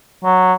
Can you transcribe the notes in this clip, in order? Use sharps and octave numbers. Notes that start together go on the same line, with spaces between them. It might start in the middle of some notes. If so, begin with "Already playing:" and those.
F#3